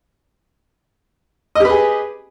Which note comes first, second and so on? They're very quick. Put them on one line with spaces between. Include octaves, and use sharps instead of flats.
D#5 G4 B4 G#4